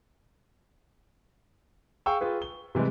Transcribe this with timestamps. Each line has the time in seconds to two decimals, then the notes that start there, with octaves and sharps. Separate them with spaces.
2.06 G#4 F5 G5 C#6 E6
2.21 F4 G#4 B4
2.42 G7
2.75 C3 E3 G3 G#3